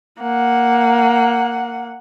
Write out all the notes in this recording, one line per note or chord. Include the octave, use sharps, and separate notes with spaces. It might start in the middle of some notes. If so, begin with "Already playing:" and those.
A#3 F#5